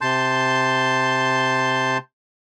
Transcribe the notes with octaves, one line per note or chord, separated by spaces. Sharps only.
C3 A5 C6 G6